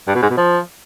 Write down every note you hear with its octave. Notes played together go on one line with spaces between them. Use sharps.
G2
B2
G#2
B2
F3